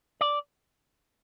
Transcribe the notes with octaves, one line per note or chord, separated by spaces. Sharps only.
D5